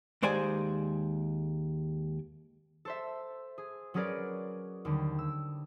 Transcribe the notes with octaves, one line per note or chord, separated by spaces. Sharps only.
D#2 G#3 C5 D5 G#5
A4 C5 E5
G#4
F#3 C#4 G#4 A#4 B4 D5
D#2 D3 G3
E6